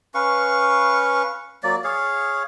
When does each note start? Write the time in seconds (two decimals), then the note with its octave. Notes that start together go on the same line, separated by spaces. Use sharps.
0.14 C#4 B4 F5 C#6
1.63 F#3 A#3 D5
1.84 G#4 C#5 F5